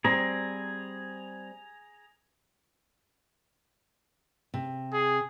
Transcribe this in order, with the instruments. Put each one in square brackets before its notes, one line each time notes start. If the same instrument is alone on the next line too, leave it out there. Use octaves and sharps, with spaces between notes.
[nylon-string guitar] G3 C4 [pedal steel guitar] G#4 A#5
[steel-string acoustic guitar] C3
[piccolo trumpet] G#4